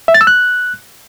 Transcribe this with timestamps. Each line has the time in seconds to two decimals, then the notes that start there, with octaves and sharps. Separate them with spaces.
0.08 E5
0.14 A6
0.21 E6
0.27 F#6